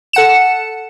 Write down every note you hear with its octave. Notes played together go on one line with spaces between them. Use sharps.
A4 F#5 C#7 E7